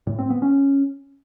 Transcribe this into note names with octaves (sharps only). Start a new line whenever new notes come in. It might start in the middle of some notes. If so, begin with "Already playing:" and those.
A2
C4
B3
C#4